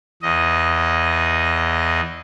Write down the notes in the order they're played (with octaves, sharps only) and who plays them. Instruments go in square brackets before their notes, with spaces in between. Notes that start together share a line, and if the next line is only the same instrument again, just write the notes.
[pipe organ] E2 D#5